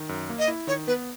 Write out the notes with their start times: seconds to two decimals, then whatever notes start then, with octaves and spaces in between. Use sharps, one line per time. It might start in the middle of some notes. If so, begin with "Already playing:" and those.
Already playing: D#3
0.09 F#2
0.29 A#3
0.39 D#5
0.48 E4
0.67 D#3 C#5
0.87 B3 B4